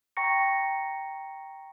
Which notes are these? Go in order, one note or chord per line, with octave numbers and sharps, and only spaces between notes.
G5 A#5 C#6 A#6 C#7